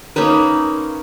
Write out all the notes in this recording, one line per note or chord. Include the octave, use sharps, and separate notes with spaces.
A#3 C#4 D#4 B4